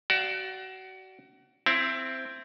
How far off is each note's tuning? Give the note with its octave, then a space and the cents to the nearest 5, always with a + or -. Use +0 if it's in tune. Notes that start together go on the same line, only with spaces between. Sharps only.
F#4 +30 D5 +0 F5 +0
C4 +0 E4 +15